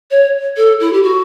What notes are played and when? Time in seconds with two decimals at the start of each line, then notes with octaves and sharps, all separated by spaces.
0.11 C#5
0.57 A4
0.80 E4
0.93 G4
1.03 F#4